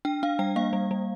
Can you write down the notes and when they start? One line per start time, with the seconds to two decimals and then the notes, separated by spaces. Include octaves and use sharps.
0.05 D4 G5
0.23 D4 F5
0.39 G3 G5
0.56 A#3 F5
0.73 G3
0.91 G3